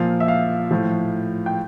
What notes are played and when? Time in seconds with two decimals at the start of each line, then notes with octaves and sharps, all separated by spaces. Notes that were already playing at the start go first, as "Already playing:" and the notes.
Already playing: A#2 F3 F5
0.20 E5
0.28 F5
0.71 A2 F3
1.46 G5